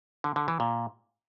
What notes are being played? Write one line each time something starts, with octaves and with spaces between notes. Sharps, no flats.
D3
D3
E3
A#2